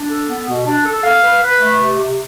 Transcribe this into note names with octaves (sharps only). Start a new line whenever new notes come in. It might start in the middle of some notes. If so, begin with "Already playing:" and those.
Already playing: D4
A4
B3
B2
D4
A4
F5
B4
B4
A3
C3
C3